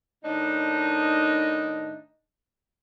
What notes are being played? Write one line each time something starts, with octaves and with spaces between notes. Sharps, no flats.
A2 D#3 D4 D#4